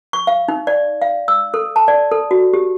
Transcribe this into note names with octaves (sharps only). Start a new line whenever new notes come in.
C#6
F5
D#4
D5
F5
E6
A4
A5
D5
A4
F#4
G4